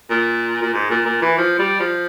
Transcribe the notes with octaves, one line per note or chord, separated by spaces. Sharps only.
A#2
A#2
G#2
A#2
A#2
E3
F3
G3
F3